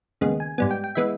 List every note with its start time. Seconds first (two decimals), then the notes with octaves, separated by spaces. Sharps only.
0.21 D#2 C#3 G#3 B3
0.40 G#5
0.58 G#2 G3 B3 G#5
0.71 G5
0.84 G5
0.95 E3 G#3 B3 E5